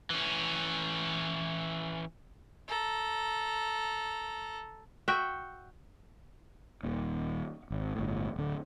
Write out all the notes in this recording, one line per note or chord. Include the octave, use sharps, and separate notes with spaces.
E3 C#4
A4 A#5
F#4 E5 G5
D#1 D#2
G#1
G1 A2
D1 D3